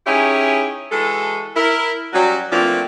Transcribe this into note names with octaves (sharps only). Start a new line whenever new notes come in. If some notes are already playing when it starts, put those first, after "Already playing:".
C#4 D#4 E4 G4 G#4 C#5
E3 G#3 F#4 A4
E4 A#4
F#3 G3 C#4
E3 F3 A3 A#3 C4 D4